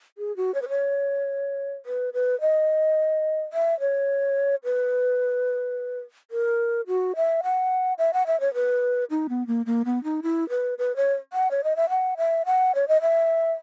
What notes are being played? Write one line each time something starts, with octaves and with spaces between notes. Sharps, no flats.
G#4
F#4
C#5
B4
C#5
B4
B4
D#5
E5
C#5
B4
A#4
F#4
E5
F#5
E5
F#5
E5
C#5
B4
D#4
B3
A#3
A#3
B3
D#4
E4
B4
B4
C#5
F#5
C#5
D#5
E5
F#5
E5
F#5
C#5
D#5
E5